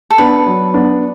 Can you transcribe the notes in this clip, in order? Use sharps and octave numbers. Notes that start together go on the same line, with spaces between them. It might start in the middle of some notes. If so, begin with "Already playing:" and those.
A4
B3 D4 B4
F#3
B3 D4